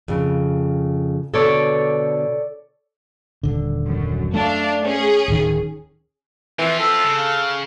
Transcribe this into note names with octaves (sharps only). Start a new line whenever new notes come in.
F2 C#3
B2 D3 A4 C#5 D5
D#1 D3
F#2
A3 D4 F5
C#4 G#4
D1 D#3
E3 C4 F4
A4 E5
C#3
F5